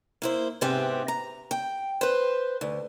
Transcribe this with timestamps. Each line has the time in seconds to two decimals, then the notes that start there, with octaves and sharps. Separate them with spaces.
0.22 A#3 E4 C5
0.61 G#2 C3 B3 C4 G4 E5
1.08 A#5
1.51 G5
2.01 B4 C5
2.61 D2